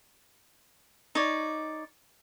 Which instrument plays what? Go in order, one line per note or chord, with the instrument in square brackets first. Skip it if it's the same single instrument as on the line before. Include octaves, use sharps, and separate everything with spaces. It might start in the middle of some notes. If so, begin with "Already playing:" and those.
[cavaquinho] D#4 C#5 D5